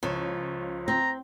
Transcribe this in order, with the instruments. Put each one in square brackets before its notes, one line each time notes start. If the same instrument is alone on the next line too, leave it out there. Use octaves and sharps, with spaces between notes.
[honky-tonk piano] C#2 C#5 [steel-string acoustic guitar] F3
[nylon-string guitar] C4 [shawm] A#5